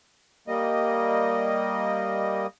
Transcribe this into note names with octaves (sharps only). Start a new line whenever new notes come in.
G3 A#3 D#5